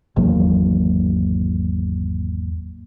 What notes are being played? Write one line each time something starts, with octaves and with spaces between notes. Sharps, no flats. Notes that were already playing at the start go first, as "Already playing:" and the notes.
G#1 E2 F#3 A#3